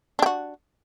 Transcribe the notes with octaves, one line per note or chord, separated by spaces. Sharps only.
D4 F#4 G4